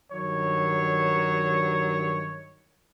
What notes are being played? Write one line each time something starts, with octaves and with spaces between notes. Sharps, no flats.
G2 D#3 F#3 C#5